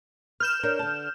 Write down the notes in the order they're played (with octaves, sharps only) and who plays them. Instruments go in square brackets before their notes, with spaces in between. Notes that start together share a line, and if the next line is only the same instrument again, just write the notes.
[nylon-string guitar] B4 [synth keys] F6 G6 E7
[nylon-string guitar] D4 A#4 C#5
D3 A5